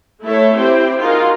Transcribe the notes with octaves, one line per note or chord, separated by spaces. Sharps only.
A3 E4 A4 C#5 E5
C4 E4 G4 C5 G5
D#4 F4 F#4 G#4 A#4